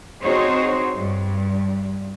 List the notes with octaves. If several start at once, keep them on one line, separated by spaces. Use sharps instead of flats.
C4 D#4 F#4 G#4 C5 C#5
G2